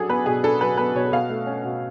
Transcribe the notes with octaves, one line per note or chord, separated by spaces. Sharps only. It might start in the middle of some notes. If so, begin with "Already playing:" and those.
Already playing: F#3 D4 G#4 A4
B3 B4
B2 G#4
D4 A4
F#3 B4
B3 B4
B2 C#5
B2 F5
A3
C#4
B2